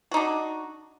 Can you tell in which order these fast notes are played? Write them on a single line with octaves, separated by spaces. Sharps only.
F#4 D#4 D4